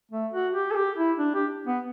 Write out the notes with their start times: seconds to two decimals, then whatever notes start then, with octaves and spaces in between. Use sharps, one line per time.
0.11 A3
0.33 F#4
0.54 G4
0.71 A4
0.76 G4
0.97 E4
1.19 D4
1.34 G4
1.67 B3